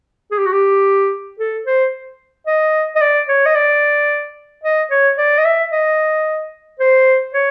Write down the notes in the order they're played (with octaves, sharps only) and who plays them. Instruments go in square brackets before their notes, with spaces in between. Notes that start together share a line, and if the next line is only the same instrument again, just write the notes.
[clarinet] G#4
G4
F#4
G4
A4
C5
D#5
D#5
D5
C#5
D#5
D5
D#5
C#5
D5
D#5
E5
D#5
C5
C#5